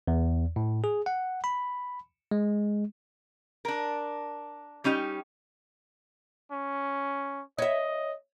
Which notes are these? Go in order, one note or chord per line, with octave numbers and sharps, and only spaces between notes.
E2
A2
G#4
F#5
B5
G#3
D4 A#4
G3 C#4 D#4 G4
C#4
C#5 D#5 E5